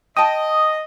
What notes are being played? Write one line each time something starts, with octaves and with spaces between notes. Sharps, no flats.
D#5 G5 A5 D#6